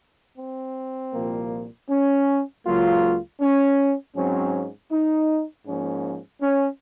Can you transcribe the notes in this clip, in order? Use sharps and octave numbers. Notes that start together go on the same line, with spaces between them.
C4
C2 A#2 F3 A#3
C#4
C#2 C#3 F#3 A#3 F4
C#4
G#2 F#3 C4 C#4
D#4
G#2 F3 A#3 C#4
C#4